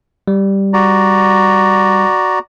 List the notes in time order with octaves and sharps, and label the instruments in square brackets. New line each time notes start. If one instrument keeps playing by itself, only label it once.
[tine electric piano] G3
[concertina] F#4 D5 A#5